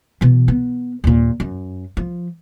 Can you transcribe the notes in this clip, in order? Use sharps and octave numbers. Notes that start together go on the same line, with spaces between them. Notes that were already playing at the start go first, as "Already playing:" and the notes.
B2 E3
B3
D#2 A#2
F#2
F3